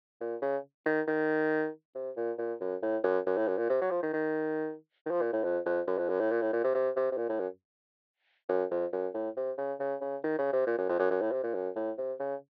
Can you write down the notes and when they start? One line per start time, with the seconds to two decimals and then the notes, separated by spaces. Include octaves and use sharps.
0.21 A#2
0.42 C#3
0.86 D#3
1.08 D#3
1.95 C3
2.17 A#2
2.38 A#2
2.60 F#2
2.82 A2
3.04 F#2
3.26 F#2
3.37 A2
3.48 F#2
3.58 A#2
3.70 C3
3.81 F#3
3.91 F3
4.03 D#3
4.13 D#3
5.06 D#3
5.11 F3
5.21 A#2
5.33 A2
5.44 F2
5.66 F2
5.87 F#2
5.98 F2
6.09 F#2
6.20 A2
6.31 A#2
6.42 A2
6.53 A#2
6.64 C3
6.75 C3
6.96 C3
7.12 C3
7.18 A#2
7.29 A2
7.40 F#2
8.49 F#2
8.71 F2
8.93 F#2
9.14 A2
9.37 C3
9.58 C#3
9.80 C#3
10.01 C#3
10.24 D#3
10.38 C#3
10.53 C3
10.67 A#2
10.78 F#2
10.89 F2
10.99 F#2
11.11 F#2
11.21 A2
11.32 C3
11.43 A#2
11.54 F#2
11.76 A2
11.98 C3
12.20 C#3